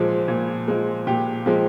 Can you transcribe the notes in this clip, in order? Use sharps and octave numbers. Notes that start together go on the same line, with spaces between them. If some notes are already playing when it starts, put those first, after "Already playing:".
Already playing: A#2 F3 G#3
A#2
F3 G#3
A#2 G4
F3 G#3